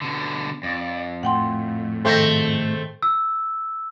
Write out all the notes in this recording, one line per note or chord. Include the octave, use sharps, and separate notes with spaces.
B2 D3
F2 D5
A2 F#5 G5 C6
G#2 D#3 A3 C4 A#6
E6